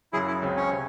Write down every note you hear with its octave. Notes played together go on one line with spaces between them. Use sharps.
F#2 C#3 F#3 E4 G#4
E4
C#2 C#3 F#3 C4
C#4
C3